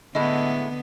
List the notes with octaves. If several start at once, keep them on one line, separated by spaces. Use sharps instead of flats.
A2 D3 G#3 B3 E4 D#5